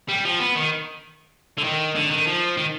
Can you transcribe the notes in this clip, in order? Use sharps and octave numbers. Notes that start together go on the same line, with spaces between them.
G3
F3
B3
D#3
D3
D#3
D3
D#3
F3
D#3